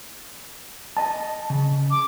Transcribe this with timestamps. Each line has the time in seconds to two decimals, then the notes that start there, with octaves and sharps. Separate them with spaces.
0.97 D#5 A5
1.50 C#3
1.91 D6